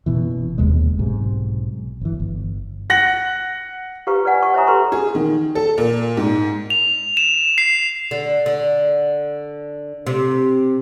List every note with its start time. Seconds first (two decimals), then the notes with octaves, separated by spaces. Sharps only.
0.06 F#1 B2 E3
0.58 F#1 D#2 C3 G#3
0.99 B1 G#2 C3
2.01 G1 E3
2.20 G1
2.90 F#5 A#6 F#7
4.07 G4 B4 C5 F5 A#5 C#6
4.25 B4 D5 F5 F#5 G#5
4.43 C#6
4.54 C5 C#5 E5 G#5 A#5 D#6
4.67 G4 A4 B4 A#5 C6 C#6
4.92 G#4
5.15 D#3
5.55 A4
5.78 A#2
6.17 G#2
6.70 F7
7.17 E7
7.58 C7
8.11 D3
8.46 D3
10.07 C3